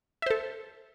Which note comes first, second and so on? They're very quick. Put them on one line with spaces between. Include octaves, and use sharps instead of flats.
E5 C5 A4